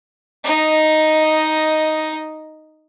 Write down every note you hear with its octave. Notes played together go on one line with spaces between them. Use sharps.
D#4 D#5